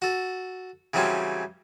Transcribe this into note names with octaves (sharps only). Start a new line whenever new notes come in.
F#4 A4
C#3 E3 F#3 G3 C4 C#4